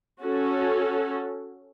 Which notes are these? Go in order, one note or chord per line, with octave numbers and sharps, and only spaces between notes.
C#4 F#4 A4